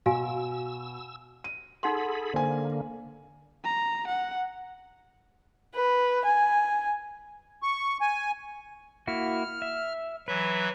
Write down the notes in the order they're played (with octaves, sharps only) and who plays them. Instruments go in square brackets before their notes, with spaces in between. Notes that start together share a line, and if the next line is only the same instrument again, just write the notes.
[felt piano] B2 [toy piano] F#4 F5 G#5 [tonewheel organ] E6
[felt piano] D#7
[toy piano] D#4 F#5 C6 [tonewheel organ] G#4 A4 B5
[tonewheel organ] D3 A#3 [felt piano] C5 G#5
[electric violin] A#5
F#5
[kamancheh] B4
G#5
[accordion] C#6
G#5
[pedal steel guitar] A#3 E4 F#4 [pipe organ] F6
[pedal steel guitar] E5
[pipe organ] E3 F#3 E5 [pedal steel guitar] B4